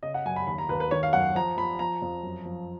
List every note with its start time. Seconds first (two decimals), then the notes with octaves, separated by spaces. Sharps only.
0.03 C#3 D#5
0.14 F#5
0.26 F#2 G#5
0.36 B5
0.47 D#2 B5
0.58 A#5
0.69 D#2 B4
0.80 B4
0.91 D#3 C#5
1.03 F5
1.13 F#2 F#5
1.35 F3 A#5
1.57 F3 B5
1.79 F3 A#5
2.02 F2
2.23 F#2
2.45 F3